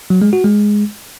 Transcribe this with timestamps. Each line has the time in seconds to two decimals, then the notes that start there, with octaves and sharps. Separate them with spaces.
0.10 F#3
0.22 G#3
0.33 F#4
0.44 G#3